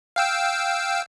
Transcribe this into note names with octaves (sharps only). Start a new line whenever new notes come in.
F5 G5 E6